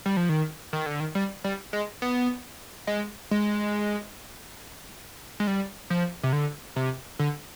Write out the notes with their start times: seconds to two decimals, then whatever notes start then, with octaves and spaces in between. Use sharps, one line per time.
0.06 G3
0.17 F3
0.29 D#3
0.73 D#3
0.86 D3
1.00 D#3
1.15 G3
1.44 G3
1.73 G#3
2.02 B3
2.87 G#3
3.31 G#3
5.40 G#3
5.47 G3
5.90 F3
6.23 C3
6.33 D3
6.76 C3
7.19 D3